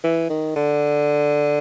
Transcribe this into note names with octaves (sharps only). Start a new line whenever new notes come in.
E3
D#3
D3